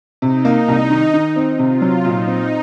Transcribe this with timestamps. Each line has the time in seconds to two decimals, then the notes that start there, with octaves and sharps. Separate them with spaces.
0.22 C3 D#4
0.45 A#3
0.68 C2
0.90 D#3
1.13 D#3
1.36 C4
1.59 C3 F4
1.82 F#3
2.04 A#2 D#4
2.27 C4